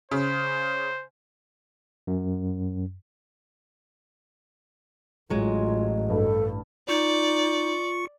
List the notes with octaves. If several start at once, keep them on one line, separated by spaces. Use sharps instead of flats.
C#3 C5
F#2
A1 F#3 G#3 F4
G2 A4
D#4 F4 D5 C#6 C#7